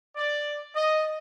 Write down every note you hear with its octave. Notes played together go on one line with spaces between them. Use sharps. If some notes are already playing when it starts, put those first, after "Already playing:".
D5
D#5